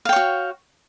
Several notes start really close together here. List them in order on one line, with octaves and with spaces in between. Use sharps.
F5 G5 C#5 F#4